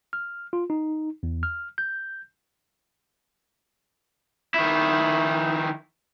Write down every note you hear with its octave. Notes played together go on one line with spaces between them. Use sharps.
F6
F4
D#4
E2
F6
G6
D#3 E4